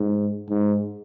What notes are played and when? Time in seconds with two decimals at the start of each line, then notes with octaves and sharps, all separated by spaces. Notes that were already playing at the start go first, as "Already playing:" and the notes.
Already playing: G#2
0.49 G#2